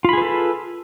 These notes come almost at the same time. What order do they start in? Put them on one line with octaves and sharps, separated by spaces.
F4 B5 G#4 B4 A4